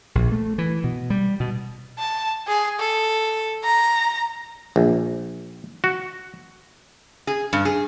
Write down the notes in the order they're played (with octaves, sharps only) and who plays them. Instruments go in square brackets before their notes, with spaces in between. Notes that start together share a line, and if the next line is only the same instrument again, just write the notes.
[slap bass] A#1
A3
E3
B2
G3
B2
[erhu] A5
G#4
A4
A#5
[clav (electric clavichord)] A#1
F#4
[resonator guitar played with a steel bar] G#4
G2
G#4